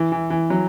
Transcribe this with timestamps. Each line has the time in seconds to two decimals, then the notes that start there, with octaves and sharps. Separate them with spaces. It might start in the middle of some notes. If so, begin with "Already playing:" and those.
Already playing: E3
0.12 E3
0.30 E3
0.50 F#3